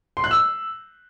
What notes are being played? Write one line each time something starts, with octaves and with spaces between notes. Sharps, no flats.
C6
F#6
E6